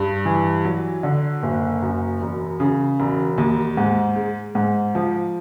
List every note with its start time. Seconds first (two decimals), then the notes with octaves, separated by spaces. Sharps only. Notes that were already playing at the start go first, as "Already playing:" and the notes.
Already playing: G2
0.25 E3
0.65 F#3
1.03 D3
1.43 F#1
1.82 F#2
2.21 E1
2.60 C#3
3.00 E1
3.38 D#2
3.77 G#2
4.16 G#3
4.55 G#2
4.95 F3